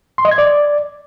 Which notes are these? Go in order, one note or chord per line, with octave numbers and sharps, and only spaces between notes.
C6
D#5
G#6
D5